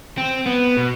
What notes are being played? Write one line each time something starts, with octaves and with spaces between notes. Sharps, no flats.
C4
B3
B2